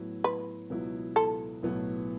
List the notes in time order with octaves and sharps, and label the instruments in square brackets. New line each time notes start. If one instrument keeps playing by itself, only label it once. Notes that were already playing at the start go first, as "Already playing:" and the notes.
Already playing: [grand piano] A2 F#3 B3 E4
[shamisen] B4
[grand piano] C#2 B2 F#3 B3 E4
[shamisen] A4
[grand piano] B1 A2 F#3 B3 E4